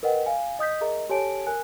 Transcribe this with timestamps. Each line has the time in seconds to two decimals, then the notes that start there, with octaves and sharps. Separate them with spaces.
0.03 A#4 B4 D#5 F#5 G5
0.26 F5 G#5
0.59 D#5 D#6 G6 B6
0.81 G#4 A#4 D#5 E5 A#5
1.09 G4 A4 C#5 G#5 A5 D7
1.47 A#4 G#5 F#6